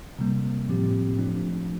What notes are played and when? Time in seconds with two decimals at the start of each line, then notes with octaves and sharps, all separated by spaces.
0.19 C3 G3 A#3
0.69 A2 F3 C4 G4
1.17 F3 A3 D4